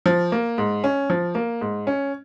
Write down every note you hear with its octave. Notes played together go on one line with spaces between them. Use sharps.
F3
A#3
G#2
C#4
F3
A#3
G#2
C#4